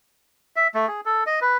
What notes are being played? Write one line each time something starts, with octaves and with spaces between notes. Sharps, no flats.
E5
A3
G#4
A4
D#5
B4